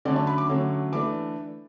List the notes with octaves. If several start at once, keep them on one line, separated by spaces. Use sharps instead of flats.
D3 F#3 A3 C#4 D5
A5
B5
D6
D3 F#3 A3 C#4
E3 A3 D4 D6